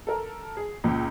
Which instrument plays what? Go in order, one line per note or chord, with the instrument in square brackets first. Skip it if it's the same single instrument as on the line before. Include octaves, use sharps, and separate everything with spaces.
[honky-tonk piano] A4 A#4
G#4
C#2 A#2